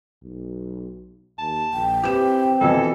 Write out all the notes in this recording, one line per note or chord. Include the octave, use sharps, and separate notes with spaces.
B1
D#2 A5
A#1 G5
E3 C4 G4 E7
F2 B2 E3 A4